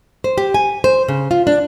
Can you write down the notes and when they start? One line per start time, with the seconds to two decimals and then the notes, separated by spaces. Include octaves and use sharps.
0.24 C5
0.38 G4
0.54 G#5
0.84 C5
1.08 C#3
1.31 F4
1.47 D4